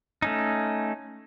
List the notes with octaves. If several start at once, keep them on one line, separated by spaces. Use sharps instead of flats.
A3 C#4 D#4